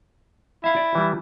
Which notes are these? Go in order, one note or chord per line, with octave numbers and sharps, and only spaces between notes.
E4 E5 F5
D5
E3 G3